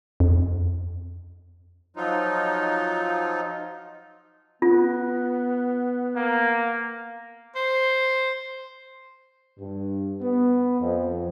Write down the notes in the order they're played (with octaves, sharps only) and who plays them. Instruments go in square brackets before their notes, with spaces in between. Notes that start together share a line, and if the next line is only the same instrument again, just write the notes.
[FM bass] F2
[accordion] F3 F#3 D#4 F4
[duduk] B3 [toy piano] F4
[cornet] A#3
[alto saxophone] C5
[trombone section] G2
B3
F2